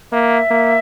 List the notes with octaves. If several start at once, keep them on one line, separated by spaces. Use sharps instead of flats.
A#3 E5
A#3